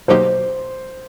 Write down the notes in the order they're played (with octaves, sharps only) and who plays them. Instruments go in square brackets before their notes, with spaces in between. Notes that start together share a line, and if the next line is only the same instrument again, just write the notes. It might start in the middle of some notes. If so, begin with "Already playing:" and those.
[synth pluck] B2 F#3 A#3 D#4 G4 [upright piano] C5